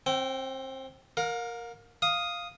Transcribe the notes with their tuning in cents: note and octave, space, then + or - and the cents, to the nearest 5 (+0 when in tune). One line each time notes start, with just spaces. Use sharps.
C4 +25 G5 -25
A#4 +0 F5 +40
F5 +0 D#6 +0